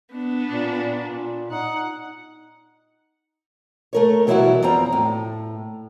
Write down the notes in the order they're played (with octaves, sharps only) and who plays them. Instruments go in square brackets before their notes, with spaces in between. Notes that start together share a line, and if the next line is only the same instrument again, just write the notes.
[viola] B3 D4
[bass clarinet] A#2
A#2
[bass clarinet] D#4 [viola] F#5
[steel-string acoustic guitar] A3 A#4 C#5
B2 E3 F#3 G3 E4 F#4
E2 F3 C4 A#5
A2